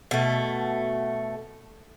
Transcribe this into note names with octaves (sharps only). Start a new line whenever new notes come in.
B2 A3